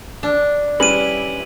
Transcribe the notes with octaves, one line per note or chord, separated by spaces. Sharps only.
D4
G3 C#4 E4 G#4 B4 D#7 F#7